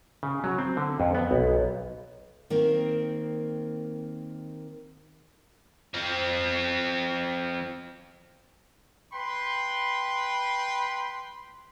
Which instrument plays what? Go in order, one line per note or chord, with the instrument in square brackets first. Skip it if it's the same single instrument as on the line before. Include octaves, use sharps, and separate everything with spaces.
[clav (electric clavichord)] C#3
F#3
C4
D3
F2
B3
B1
[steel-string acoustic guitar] D#3 A#3 C4
[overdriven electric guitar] F3 C4
[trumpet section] B4 G5 B5 C6